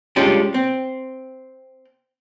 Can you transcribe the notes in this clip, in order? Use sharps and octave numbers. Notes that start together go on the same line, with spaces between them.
G3 G#3 C#4 D4 F4 G4
C4